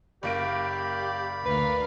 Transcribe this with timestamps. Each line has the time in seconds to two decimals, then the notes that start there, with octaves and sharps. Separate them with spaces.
0.23 F#1 A#3 G4 D5 B5 D7
1.45 D2 A#4 B4 F5